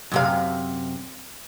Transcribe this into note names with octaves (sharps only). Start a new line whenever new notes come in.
F#2 C3 F5